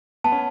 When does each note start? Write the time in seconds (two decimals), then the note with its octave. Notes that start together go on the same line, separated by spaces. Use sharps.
0.24 B3 A5
0.32 C#4